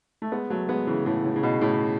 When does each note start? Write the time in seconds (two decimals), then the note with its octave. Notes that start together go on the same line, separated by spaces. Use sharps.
0.22 A3
0.32 G#3 B3
0.50 F#3 A3
0.69 G#3 B3
0.87 C#3 E3
1.06 A2 C#3
1.25 A2
1.36 C#3
1.43 B2
1.61 A2 C#3